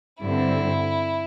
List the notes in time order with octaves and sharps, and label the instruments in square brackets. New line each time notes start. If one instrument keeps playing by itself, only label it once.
[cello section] G2 D3 C4 [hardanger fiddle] E4